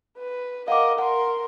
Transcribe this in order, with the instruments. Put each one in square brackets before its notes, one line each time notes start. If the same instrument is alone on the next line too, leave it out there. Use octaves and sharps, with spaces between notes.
[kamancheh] B4
[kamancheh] A#4 D#5 [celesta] F5 F#5 D6
[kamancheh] A#4 C6 [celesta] F#5